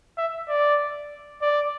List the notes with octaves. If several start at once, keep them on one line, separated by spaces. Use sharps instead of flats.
E5
D5
D5